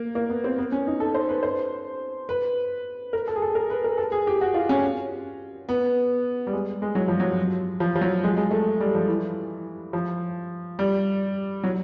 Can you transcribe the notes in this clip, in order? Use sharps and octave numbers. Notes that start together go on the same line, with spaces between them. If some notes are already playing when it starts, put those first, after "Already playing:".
Already playing: A#3
A#3
B3
C4
B3
C#4
D#4
A4
C5
B4
C5
B4
A#4
A4
G#4
A4
A#4
B4
A#4
A4
G#4
G4
F#4
F4
C#4
B3
G3
G#3
G#3
F#3
F3
F#3
F3
F3
F#3
G#3
G#3
A3
G3
F3
E3
F3
G3
F#3